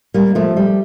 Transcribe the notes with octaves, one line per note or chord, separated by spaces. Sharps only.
G3 A#3
F3 A3
G3